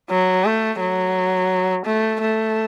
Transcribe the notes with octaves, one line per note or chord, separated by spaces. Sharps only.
F#3
A3
F#3
A3
A3